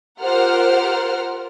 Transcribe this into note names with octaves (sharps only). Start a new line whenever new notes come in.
F4 G4 A#4 C5 F#5 F6